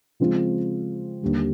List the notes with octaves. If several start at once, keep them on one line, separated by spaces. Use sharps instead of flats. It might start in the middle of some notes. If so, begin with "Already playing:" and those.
C#3 F3 G#3 C4 F4
D#2 D3 G3